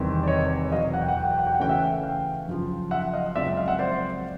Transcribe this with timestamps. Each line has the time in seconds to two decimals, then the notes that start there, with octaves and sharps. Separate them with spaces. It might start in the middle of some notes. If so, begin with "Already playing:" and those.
Already playing: E2 C3 D#3 G3 C4
0.23 D5
0.28 C#5 D#5
0.72 E2 B2 F#3 D#5 F5
0.94 F#5
1.02 G5
1.08 F#5
1.16 G5
1.24 F#5
1.31 G5
1.39 F#5
1.47 G5
1.54 F#5
1.60 C#3 E3 A3 C#4 G5
1.69 E5 F#5
2.03 F5 G5
2.47 F#2 C#3 F3
2.91 E5 F#5
3.13 D#5 F5
3.35 F#2 C#3 F3 G#3 C4 D5 E5
3.57 D#5 F5
3.68 E5 F#5
3.79 C5 D5